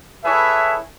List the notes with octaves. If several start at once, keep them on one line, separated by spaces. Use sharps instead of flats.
E4 G#4 A4 B4 C#5 E5